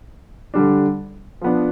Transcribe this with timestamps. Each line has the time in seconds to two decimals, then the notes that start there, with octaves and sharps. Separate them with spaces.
0.54 D3 G3 D4
1.41 F3 B3 D4